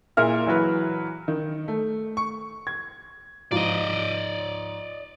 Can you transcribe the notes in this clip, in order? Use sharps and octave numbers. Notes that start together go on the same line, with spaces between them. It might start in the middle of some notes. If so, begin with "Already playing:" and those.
A#2 E4 G#4 A#4 E5 F6
E3 F#3 F#4 B4
D#3
A3
C#6
G#6
G#2 F3 F4 D5 D#5